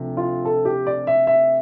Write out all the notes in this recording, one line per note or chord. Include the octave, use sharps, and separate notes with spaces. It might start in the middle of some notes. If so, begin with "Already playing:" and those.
Already playing: D2 C3 F3
F4
A4
G4
D5
E5
E5